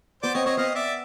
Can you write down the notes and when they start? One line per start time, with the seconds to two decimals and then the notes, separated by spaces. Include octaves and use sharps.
0.23 B3 C5 D5
0.34 C4 C#5 D#5
0.46 C4 C#5 D#5
0.57 B3 D#5 F5
0.75 D5 E5